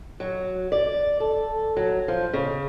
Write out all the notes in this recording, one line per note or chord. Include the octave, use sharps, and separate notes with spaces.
F#3
D5
A4
F#3
F3
C#3